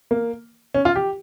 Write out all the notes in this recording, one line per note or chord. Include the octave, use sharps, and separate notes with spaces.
A#3
C#4
F4
G4